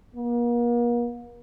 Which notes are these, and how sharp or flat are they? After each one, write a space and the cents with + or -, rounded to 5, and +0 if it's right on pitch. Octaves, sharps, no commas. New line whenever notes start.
A#3 +40